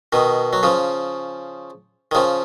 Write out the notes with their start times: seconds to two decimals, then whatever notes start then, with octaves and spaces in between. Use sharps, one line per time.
0.13 B2 D#3
0.53 F#3
0.63 C#3 F3
2.11 D#3
2.15 C#3 F3